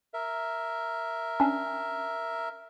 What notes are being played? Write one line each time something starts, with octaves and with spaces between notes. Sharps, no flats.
A#4 E5
C#4 D4